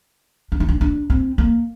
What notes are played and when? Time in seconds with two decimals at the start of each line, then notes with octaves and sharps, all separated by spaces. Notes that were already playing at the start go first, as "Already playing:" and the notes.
0.52 D4
0.60 D#4
0.69 D4
0.81 D4
1.10 C4
1.38 A#3